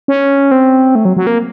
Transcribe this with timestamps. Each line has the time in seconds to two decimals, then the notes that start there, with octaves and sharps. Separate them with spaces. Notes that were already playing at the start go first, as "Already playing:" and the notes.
0.08 C#4
0.51 C4
0.95 A3
1.05 F#3
1.17 F#3
1.27 A#3